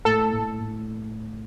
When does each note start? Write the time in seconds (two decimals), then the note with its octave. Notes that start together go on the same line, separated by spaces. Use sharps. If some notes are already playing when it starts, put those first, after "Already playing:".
0.05 A2 A4
0.32 A2
0.59 A2